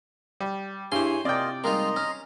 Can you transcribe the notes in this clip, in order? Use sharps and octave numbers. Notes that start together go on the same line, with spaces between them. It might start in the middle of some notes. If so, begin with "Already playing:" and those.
G3
G2 E4 G4 G#4 C5 C#5 G#5 C6
C3 A#3 C4 F4 D5 D#5 G5
G3 G#3 A#3 D#4 F4 D#5 A#5 C6
C#4 F6